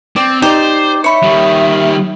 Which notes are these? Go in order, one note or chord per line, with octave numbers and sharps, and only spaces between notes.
C4 D5
D#4 G4 C5 D5
C#5 E5 B5 C#6
D#3 G3